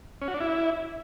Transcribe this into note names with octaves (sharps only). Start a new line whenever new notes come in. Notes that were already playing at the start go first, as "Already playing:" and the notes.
C#4
F#4
D4
E4